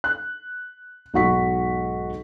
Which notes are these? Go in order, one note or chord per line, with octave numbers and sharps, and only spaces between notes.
F#6
B1 G#2 F#3 F#4 C#6 B6